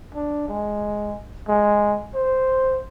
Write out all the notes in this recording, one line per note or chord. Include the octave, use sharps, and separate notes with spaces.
D4
G#3
G#3
C5